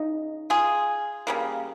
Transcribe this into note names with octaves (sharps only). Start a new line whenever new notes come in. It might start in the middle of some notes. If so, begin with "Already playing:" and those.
Already playing: C#3 D#4
F4 G#4
C#3 G3 A#3